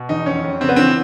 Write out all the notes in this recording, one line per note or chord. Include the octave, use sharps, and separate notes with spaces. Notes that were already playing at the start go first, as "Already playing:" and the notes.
Already playing: B2
E2 D#4
F2 C#4
F2
C#3 C4
B3
E3 C4